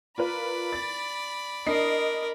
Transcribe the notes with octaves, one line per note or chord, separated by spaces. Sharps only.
F4 A#4 B4 D5 B5
A6
D4 A#4 D#5 C7